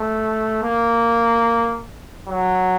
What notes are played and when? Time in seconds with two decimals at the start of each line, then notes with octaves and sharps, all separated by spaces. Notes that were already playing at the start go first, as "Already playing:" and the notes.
Already playing: A3
0.63 A#3
2.28 F#3